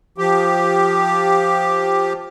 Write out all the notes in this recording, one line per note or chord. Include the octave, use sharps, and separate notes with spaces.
F3 G4